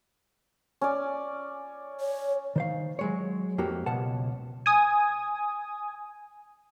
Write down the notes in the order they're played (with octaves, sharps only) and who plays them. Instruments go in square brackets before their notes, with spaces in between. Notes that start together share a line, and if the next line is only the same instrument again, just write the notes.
[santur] C#4 D5
[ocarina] C#5
[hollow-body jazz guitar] D#3 C5 F5
F#3 G#3 C#5
F2 A#3 F#4 G4 A4
C#2 B2 F#5 A5
[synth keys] G#5 D#6